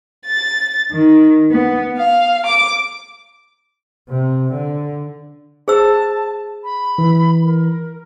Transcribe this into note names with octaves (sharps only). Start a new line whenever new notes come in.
A6
D#3
B3
F5
D6
C3
D3
G#4 C5 A5 E6
B5
E3
A#4